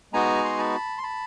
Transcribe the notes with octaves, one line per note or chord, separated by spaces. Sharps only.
G#3 B3 D#4 F#4 G#5 A#5
C6
A5 B5
C6
A5 B5